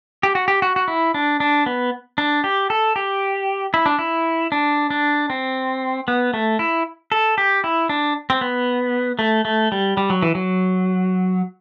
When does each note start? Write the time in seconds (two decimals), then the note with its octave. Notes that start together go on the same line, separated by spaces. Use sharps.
0.23 G4
0.35 F#4
0.48 G4
0.62 F#4
0.76 F#4
0.88 E4
1.14 D4
1.40 D4
1.66 B3
2.18 D4
2.44 G4
2.70 A4
2.96 G4
3.74 E4
3.86 D4
3.99 E4
4.52 D4
4.90 D4
5.30 C4
6.08 B3
6.34 A3
6.59 E4
7.12 A4
7.38 G4
7.64 E4
7.89 D4
8.30 C4
8.41 B3
9.19 A3
9.45 A3
9.72 G3
9.97 G3
10.10 F#3
10.22 E3
10.35 F#3